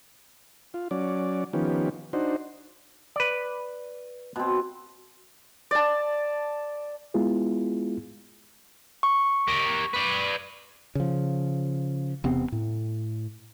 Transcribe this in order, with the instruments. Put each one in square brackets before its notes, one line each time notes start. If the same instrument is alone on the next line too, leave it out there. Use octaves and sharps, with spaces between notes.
[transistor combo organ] F4
F#3 C#4 D5
D#3 F3 B3 C#4 G4
D4 D#4 F#4 C5
[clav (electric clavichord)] B4 D5
[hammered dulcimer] B2 C4
[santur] D5 A5
[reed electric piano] G#3 B3 E4 F4 G#4
[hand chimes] C#6
[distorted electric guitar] G4 A#4
B4 D5
[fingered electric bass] C#3 F3
E1 C3 B3 C4
A2